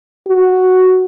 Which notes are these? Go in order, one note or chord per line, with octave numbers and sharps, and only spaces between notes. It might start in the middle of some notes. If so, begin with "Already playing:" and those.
F#4